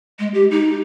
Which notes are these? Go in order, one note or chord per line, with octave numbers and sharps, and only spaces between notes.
G#3
G4
D#4